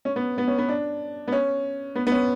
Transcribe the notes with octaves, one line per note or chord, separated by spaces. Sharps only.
C#4
B3
B3
C#4
B3
D4
B3
C#4
B3
B3
C#4